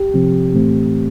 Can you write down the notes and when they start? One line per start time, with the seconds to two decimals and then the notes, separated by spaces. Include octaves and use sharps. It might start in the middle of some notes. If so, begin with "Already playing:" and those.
Already playing: G4
0.14 C3 F3 C4
0.54 A2 E3 A3 C4